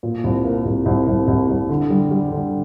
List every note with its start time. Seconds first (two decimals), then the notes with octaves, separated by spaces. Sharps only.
0.03 A#2
0.24 C2
0.44 A#3
0.65 C2
0.86 C2
1.07 C2
1.28 C2
1.48 C2
1.69 D3
1.90 G3
2.11 G3
2.32 D3